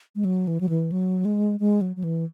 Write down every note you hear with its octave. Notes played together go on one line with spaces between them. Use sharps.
G#3
F#3
E3
F#3
E3
F#3
G#3
G#3
F#3
F#3
E3